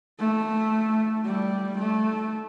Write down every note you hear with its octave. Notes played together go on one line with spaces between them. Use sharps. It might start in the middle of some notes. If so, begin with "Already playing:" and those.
A3
G3
A3